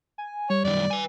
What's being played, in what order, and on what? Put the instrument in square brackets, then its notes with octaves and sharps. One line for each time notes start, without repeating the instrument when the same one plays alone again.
[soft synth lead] G#5
[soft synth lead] G3 [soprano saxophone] C#5
[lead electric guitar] F#2 D#3 [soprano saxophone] D5
[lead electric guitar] B4 G#5